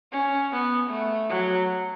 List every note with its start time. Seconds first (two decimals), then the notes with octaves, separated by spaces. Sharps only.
0.12 C#4
0.52 B3
0.90 A3
1.29 F#3